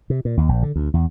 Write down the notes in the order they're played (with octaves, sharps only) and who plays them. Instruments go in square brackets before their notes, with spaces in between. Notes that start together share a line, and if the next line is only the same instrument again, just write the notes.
[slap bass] C3
A#2
D#2
A#1
D3
D2
E2